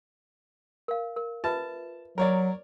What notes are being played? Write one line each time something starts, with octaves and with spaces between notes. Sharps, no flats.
A#4 F5
A#4
F4 B4 E5 A5
F#3 A#4 C#5 D5